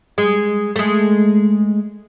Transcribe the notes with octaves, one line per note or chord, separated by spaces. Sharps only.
G#3
G#3 A3